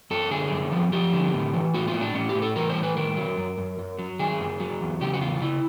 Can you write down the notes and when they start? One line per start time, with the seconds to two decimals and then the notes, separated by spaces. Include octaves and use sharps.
0.11 F#2 A4
0.31 D3 G#4
0.52 F#2
0.72 F3
0.92 F3 G4
1.13 D3
1.33 A2
1.54 E3
1.74 A2 F#4
1.88 F4
1.94 A2
2.01 D4
2.14 A2 C#4
2.29 G4
2.35 A2
2.42 A4
2.56 E3 A#4
2.70 C5
2.76 A2
2.83 B4
2.97 D#3 A#4
3.17 F#3
3.37 F#2
3.58 F#2
3.79 F#2
3.99 F#3
4.19 D#3 G#4
4.40 F#2
4.60 F#3
4.80 E2
5.01 C#3 G4
5.14 F#4
5.21 E2 F4
5.42 C#3 E4